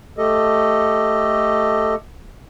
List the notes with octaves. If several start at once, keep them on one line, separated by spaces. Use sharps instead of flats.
A3 G4 A4 D#5